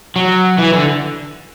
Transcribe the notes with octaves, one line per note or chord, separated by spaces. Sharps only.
F#3
E3
D3